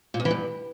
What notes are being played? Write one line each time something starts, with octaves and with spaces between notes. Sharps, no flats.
A#2
E2
E3
G2